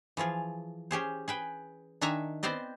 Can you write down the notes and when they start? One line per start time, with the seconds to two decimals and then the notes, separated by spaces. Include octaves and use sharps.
0.17 E3 F3 F4 G#4
0.91 C#4 G4 G#4 C5
1.28 G#4 B4 G5
2.01 D#3 D4 E5 G#5 A#5
2.43 B3 C4 C5 D5 D#5